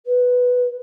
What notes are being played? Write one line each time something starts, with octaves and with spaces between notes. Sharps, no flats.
B4